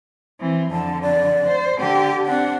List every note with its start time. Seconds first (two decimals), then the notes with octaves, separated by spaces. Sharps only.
0.40 E3 C4
0.71 F2 D3 A5
1.02 D5
1.47 C5
1.80 D3 G4 G5
2.26 C4 D4 F#5